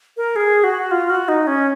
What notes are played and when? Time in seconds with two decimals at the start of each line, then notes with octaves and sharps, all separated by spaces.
0.17 A#4
0.36 G#4
0.64 F#4
0.91 F4
1.10 F#4
1.28 D#4
1.47 C#4